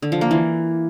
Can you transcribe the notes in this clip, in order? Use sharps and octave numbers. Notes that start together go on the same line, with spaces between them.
D3
F3
A#3
E3